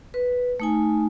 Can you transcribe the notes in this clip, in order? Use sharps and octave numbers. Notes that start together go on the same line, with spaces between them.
B4
A3 D#4 G#5